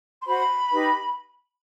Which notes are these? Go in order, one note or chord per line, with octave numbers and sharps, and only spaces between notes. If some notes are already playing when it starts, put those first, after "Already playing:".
C6
F#4 C5 B5
D#4 G4 B4